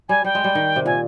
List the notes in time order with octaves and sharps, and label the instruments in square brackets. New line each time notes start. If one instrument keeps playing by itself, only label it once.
[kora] G3 [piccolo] G#5
[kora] G3 [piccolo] G5
[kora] G#3
G3
D#3
C3
[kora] A#2 [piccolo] G#5